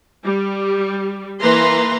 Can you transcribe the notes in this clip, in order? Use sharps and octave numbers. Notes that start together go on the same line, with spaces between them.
G3
E3 A#3 B4 A#5 C6